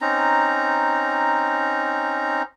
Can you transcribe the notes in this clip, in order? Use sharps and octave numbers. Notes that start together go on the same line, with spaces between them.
C4 C#4 D#4 A#5